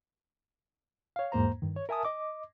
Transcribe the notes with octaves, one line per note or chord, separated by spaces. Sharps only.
C#5 F5
E2 G#2 A#3 C5 A#5
G2 D#3
C#5
A#4 E5 G#5 A5 D#6
D#5 D6